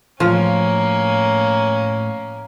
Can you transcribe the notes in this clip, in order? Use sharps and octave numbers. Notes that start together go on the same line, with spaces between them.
A2 F3 A#3 C#4